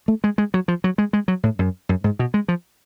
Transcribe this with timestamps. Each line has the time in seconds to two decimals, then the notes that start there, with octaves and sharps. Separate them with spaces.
0.08 A3
0.24 G#3
0.38 G#3
0.54 F#3
0.68 F3
0.84 F#3
0.98 G#3
1.13 G#3
1.28 F#3
1.43 A2
1.59 F#2
1.89 F#2
2.04 G#2
2.19 B2
2.34 G#3
2.48 F3